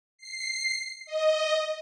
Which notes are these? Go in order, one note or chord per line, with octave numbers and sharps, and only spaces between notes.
C7
D#5